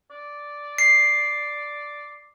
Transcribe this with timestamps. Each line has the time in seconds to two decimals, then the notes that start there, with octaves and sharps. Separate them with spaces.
0.11 D5
0.78 C7